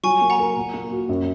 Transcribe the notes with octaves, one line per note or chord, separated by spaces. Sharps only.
F#3 G#5 C#6
A#3
F#5 A#5
A#4
A#2
A#3
F#4
F#2